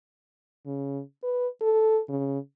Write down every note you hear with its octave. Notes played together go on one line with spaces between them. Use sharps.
C#3
B4
A4
C#3